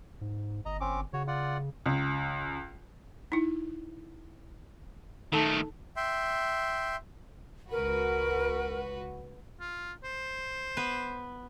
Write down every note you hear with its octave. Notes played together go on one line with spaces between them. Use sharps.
G#2
G1 D#5 A#5
C4 C#4 D6
C#3 F#4 C#5
F4 D5 F#5
C#2
D#4 E4
D#3 A3 D#4 A4 A5
E5 G5 C6
C#2 F#4 A#4 B4
F4
C5
B3 B4